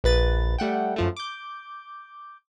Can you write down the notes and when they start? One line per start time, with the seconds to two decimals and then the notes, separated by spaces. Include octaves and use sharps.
0.04 A#1 B4 A6
0.58 G3 A3 F#5 G5
0.96 F#2 F3 A3
1.16 D6 G6